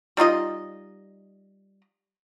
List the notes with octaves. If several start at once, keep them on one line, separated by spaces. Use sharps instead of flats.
G3 D#4 F4 D#5